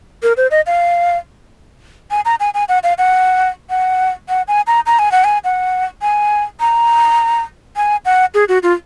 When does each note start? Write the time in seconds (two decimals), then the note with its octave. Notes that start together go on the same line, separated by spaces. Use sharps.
0.23 A#4
0.37 C5
0.51 D#5
0.66 F5
2.11 G#5
2.25 A#5
2.40 G#5
2.54 G#5
2.69 F#5
2.83 F5
2.98 F#5
3.70 F#5
4.29 F#5
4.48 G#5
4.67 A#5
4.86 A#5
4.99 G#5
5.12 F#5
5.24 G#5
5.44 F#5
6.02 G#5
6.60 A#5
7.76 G#5
8.05 F#5
8.34 G#4
8.48 F#4
8.63 F4